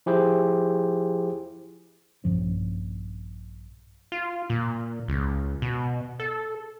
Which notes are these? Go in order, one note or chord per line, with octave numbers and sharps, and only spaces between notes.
F3 E4 G4 G#4 C5
A#1 G2 F3 C#4
F4
A#2
C#2
B2
A4